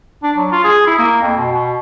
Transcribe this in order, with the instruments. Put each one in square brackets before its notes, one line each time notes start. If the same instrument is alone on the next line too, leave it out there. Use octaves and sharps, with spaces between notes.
[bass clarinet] D4
F#3
F4
G#4
E4
A#3
F2
B2
B2